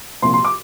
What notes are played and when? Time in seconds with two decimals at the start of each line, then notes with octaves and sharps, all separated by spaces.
0.22 C2 A#2 F3 C6
0.34 C6
0.45 D6